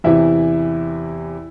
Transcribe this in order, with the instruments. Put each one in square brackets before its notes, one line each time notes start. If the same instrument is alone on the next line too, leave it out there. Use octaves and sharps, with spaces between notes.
[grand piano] E2 C3 E3 E4 E5